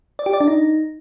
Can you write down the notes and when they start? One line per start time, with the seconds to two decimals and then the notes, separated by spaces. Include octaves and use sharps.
0.19 D5
0.26 G4
0.33 D5
0.40 D4
0.48 D#4